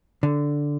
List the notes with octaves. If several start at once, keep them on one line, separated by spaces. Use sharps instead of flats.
D3